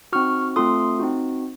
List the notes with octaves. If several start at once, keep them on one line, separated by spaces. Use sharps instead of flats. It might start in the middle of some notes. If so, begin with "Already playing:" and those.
C4 D#4 F#4 C#6 F6
A3 C4 F4 A4 C6 D#6
C4 D#4 F#4